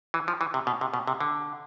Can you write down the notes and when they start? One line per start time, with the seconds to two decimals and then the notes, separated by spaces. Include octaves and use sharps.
0.14 E3
0.28 F3
0.41 E3
0.54 C3
0.67 B2
0.81 C3
0.94 B2
1.07 C3
1.21 D3